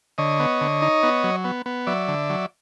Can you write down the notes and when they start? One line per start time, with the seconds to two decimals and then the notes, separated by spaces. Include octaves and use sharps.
0.18 D3 C#5 D#5
0.40 B3
0.61 D3
0.82 D#4
1.03 B3
1.24 F#3
1.44 B3
1.66 B3
1.87 F#3 D5 E5
2.08 D3
2.30 F#3